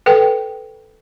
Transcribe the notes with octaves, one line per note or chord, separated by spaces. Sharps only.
A4 B4 G5